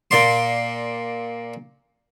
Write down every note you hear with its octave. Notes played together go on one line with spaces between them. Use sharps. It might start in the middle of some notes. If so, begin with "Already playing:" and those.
A#2 D5 C6